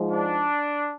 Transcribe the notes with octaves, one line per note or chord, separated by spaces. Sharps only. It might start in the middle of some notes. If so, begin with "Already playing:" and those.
Already playing: G#2 F3 G#3
D4